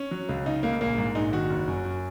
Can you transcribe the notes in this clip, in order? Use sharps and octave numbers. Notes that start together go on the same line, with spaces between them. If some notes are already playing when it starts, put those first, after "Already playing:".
Already playing: C#4
F#3
C#2
C#3 D#4
C#2 A#3
A#1 A#3
G#2
A#1 D#4
D#3 F#4
F#1
F#2
F#2